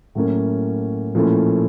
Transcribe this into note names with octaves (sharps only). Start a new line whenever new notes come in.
A2 F#3 A#3 C#4 F#4
A#2 F3 A3 C#4 E4